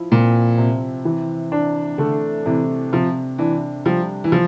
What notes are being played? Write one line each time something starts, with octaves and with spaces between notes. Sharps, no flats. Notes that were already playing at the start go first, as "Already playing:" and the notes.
Already playing: F3 E4
A#2 C4
C3
E3
D4
D3 A3
C3 E3
C3 F3
E3 D4
F3 G3
E3
F3